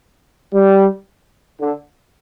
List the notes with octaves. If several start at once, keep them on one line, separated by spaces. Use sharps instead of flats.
G3
D3